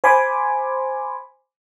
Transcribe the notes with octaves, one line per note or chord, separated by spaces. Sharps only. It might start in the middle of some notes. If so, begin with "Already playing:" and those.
C5 G#5 B5 C6 D6